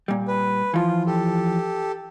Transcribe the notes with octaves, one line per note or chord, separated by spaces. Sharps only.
A#2 G3
B4
E3 F3 F4
G4 A4